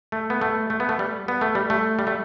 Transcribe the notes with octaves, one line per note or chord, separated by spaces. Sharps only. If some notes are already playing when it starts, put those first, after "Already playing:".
A3
B3
A3
A3
B3
A3
G3
B3
A3
G3
A3
G3
A3